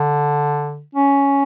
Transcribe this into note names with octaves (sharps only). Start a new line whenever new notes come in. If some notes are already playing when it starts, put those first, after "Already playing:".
Already playing: D3
C#4